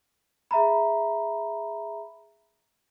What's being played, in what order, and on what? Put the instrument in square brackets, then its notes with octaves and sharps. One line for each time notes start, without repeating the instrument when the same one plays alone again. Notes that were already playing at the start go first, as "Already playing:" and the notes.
[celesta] G#4 E5 A#5 B5